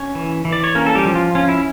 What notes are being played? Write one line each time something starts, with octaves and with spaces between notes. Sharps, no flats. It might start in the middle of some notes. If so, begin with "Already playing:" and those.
Already playing: C#4 C#5
E3
E3
D5
C#5
A#3 C#4 A#4
A4
G3 G4
F3
F4
C#4 F4
E4